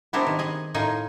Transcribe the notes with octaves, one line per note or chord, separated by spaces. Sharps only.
B3 C4 D4 E4 G4 A#4
D#3
G#4 D#5
A2 D#4 F4 A#4 D#5 G#5